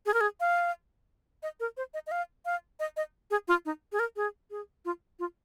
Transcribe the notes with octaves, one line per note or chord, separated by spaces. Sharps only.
G#4
A#4
G#4
F5
D#5
A#4
C5
D#5
D#5
F5
F5
D#5
D#5
G#4
F4
D#4
G#4
A#4
G#4
G#4
F4
F4